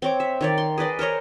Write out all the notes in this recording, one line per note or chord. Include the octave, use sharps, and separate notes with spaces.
C4 C#5 D6
E5
D#3 C#5 D5
C6
G#4 B4 D5 D#5
A#4 C5 C#5 D#5